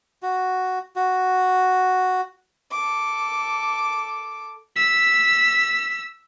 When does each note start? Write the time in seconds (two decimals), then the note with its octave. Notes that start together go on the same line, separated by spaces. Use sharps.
0.22 F#4
0.96 F#4
2.71 A4 D6
4.76 E6 B6